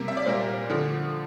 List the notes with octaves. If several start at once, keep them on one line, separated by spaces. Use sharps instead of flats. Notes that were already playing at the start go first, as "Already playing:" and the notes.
Already playing: C3 G3 A#3
E5
D5
A#2 G3 A#3 C5
D3 F3 A3